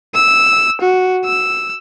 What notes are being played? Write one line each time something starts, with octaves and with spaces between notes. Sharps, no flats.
E6
F#4
E6